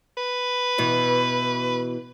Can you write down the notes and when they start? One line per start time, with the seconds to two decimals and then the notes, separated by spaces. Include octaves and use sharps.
0.17 B4
0.78 B2 E3